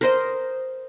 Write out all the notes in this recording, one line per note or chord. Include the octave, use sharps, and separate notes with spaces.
A#4 C5 D#5